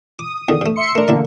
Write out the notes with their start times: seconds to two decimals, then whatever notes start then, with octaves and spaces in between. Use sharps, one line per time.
0.19 D6 D#6
0.48 E2 D3 D#3
0.61 G2 A3
0.76 E5 C6 C#7
0.95 A3 D4 A#4
1.08 A1 D3 A#3 E4 D5